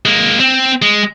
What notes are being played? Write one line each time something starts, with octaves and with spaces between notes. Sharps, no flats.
G#3 A#3
C4
G#3